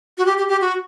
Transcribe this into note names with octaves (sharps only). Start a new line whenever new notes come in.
F#4
G4
G4
G4
F#4